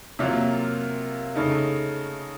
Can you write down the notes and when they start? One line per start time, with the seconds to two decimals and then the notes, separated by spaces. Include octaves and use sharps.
0.19 C3 F#3 A#3 F4
1.36 C#3 A3 D#4